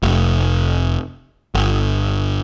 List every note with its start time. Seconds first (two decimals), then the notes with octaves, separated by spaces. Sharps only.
0.03 F1
1.55 G1